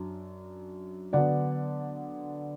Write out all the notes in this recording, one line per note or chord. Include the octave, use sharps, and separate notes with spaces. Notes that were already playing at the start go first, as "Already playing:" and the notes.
Already playing: F#2 D4
D3 F#3 B3 D4 D5 F#5